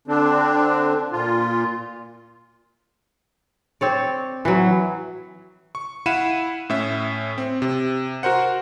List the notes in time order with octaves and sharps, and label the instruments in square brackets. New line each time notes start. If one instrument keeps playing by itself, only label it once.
[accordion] D3 C4 D4
A#2 F4
[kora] C4 C#5 D5
E3 F#3
[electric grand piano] C#6
E4 F5 F#5 B5 D#7 E7
A2 C#4 E5
C4
C3
F#4 A#4 C5 F#5